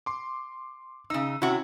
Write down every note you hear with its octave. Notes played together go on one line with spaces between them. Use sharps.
C6 D6
C#3 D#4 E6
C3 C#4 E4 F#4